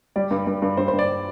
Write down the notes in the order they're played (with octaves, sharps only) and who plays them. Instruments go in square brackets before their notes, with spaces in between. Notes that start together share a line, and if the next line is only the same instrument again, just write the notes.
[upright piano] G3 D5
G2
G2
G2
G2 C5
C5
G2
D5